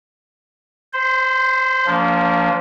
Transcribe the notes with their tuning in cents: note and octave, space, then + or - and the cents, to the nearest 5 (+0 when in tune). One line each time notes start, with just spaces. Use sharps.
C5 +0 C6 -40
F3 +0 A#3 -20 D4 -40